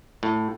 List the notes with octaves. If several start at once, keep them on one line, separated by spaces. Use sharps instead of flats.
A2